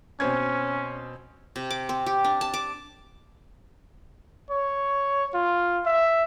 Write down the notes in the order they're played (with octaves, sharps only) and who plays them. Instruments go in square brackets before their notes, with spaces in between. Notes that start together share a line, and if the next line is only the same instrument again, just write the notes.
[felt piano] B2 C4 G#6 [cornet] C#4
[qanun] C3
D6
C4
G4
D4
A5
D6
[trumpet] C#5
F4
E5